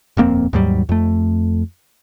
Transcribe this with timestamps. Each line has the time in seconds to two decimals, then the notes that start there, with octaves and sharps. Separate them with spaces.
0.17 D#1 F2 A#3 C4
0.53 D#2 G#2 F#3 G3
0.89 F2 A3